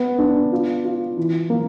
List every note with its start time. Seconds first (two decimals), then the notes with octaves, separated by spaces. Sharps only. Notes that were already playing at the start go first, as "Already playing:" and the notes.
Already playing: B3
0.18 D4
0.52 F4
0.85 F4
1.17 E3
1.50 A#3